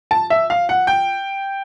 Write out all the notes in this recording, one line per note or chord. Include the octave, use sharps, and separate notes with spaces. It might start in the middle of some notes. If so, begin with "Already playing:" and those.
A5
E5
F5
F#5
G5